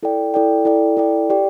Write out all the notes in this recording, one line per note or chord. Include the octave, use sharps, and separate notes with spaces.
E4 A4 D5 G5
E4 A4 D5 G5
E4 A4 D5 G5
E4 A4 D5 G5
G4 D5 G5